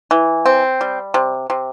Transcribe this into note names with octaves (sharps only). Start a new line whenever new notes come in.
E3
C4
G3
C3
C3